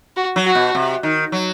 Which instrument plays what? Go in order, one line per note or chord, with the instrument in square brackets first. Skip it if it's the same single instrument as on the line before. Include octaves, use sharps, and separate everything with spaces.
[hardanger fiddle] F#4
[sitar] F#3
[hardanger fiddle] F#4
[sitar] B2
C3
D#3
F#3